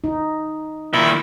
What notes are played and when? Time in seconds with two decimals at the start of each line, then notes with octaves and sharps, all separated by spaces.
0.04 D#4
0.93 A#2 D#3 E4